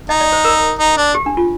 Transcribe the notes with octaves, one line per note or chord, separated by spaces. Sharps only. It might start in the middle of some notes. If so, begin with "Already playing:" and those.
D#4 D#5
D5
C5
A#4
D#4
D4
G4
D4
F4